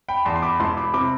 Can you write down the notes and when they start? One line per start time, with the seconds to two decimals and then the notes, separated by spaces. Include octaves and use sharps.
0.08 G5 B5
0.25 E2 A5 C6
0.36 C6
0.42 B5 D6
0.60 E1 A5 C6
0.77 B5 D6
0.94 C3 B5 D6